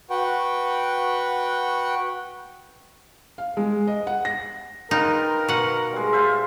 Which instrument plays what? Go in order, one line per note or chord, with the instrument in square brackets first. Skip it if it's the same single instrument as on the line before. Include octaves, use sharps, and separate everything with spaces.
[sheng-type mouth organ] F#4 B4 F#5 G5
[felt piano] F5
G#3
D#5
F#5
A#6
[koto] D#4 [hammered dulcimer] F4 B4 G5 [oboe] A#4
[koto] B2 F#5
[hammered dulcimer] G3 G#3
F4 C5 E5